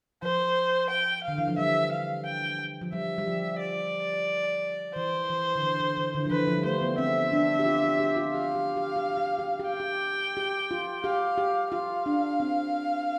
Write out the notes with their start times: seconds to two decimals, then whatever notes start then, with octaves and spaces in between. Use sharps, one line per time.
0.23 F3 C5
0.90 G5
1.24 D3 F5
1.38 E3
1.48 F3
1.58 G3 E5
1.92 F5
2.25 G5
2.81 F3
2.93 G3 E5
3.18 G3
3.27 F3
3.60 D5
4.96 E3 C5
5.30 E3
5.56 D3
5.63 E3
5.80 E3
5.97 E3
6.15 D3
6.26 F3
6.31 E3 B4
6.48 F3
6.58 G3
6.65 A3 C5
6.81 B3
6.98 C4 E5
7.32 D4
7.59 G4
7.66 F4
7.84 G4
8.00 G4
8.17 F4
8.34 G4 F5
8.55 G4
8.76 G4
8.96 G4
9.17 G4
9.39 G4
9.60 G4
9.69 G5
9.80 G4
10.37 G4
10.71 F4
11.04 G4 F5
11.38 G4
11.72 F4 F5
12.06 D4
12.40 C4